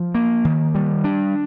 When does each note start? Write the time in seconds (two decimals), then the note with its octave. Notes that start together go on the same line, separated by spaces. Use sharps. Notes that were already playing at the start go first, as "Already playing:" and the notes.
Already playing: F3
0.15 A#3
0.45 D#3
0.75 G3
1.04 D4